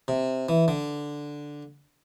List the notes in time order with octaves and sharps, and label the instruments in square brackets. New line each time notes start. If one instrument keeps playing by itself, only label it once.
[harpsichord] C3
E3
D3